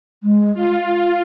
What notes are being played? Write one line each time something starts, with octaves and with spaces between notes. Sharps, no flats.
G#3
F4